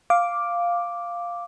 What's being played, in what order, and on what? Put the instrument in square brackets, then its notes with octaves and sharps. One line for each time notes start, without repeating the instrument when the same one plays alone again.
[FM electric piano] F5 D6